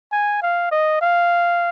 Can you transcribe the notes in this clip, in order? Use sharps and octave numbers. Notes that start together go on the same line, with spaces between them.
G#5
F5
D#5
F5